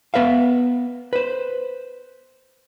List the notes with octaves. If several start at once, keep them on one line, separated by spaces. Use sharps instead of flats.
B3 B4 E5 F5
B4 C5